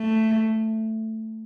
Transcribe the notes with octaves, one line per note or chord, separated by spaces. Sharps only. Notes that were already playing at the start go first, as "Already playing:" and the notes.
Already playing: A3